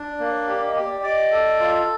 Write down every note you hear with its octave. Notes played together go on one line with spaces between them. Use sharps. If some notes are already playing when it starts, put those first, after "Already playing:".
Already playing: D4
D5
A#3
C#5
G4 D5
D#5
G4
D5
D5 D#5
A4
F4